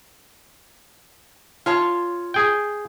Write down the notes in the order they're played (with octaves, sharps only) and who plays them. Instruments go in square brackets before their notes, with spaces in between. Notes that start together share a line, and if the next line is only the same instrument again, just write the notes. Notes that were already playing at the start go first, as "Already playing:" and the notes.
[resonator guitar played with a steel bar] F4 C#5 A5
[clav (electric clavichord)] G#4 G5